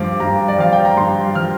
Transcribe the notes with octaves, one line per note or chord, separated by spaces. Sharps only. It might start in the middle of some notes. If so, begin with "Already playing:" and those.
Already playing: G2 F3 D6
G2 A#5
D5
F3 F5
G5
A#5
G2 C6
F3 F6